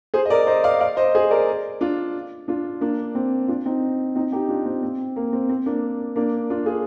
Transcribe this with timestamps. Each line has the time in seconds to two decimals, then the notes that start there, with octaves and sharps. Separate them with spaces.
0.14 G#4 C5
0.25 D#5
0.30 A#4 D5
0.47 C5 D#5
0.64 D5 F5
0.80 D5 F5
0.97 C5 D#5
1.15 G#4 C5
1.31 A#4 D5
1.81 D4 F4
2.48 D4 F4
2.81 A#3 D4
3.15 C4
3.48 D4 F4
3.65 C4 D#4
4.16 C4 D#4
4.32 D#4 G4
4.49 D4 F4
4.66 C4
4.83 C4
5.16 A#3
5.33 C4
5.49 C4
5.66 A#3 D4
6.16 A#3 D4
6.50 D4 F4
6.66 F4 G#4